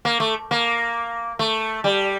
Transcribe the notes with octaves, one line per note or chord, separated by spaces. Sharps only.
A#3
A3
A#3
A3
G3